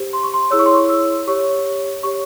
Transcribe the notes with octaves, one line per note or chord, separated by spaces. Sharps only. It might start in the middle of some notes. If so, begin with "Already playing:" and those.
Already playing: G4 C5
C6
C#6
C6
E4 G#4 C#5 E6
C#6
C6
C#6
E6
G4 C#5 C#6
G4 C#5 C#6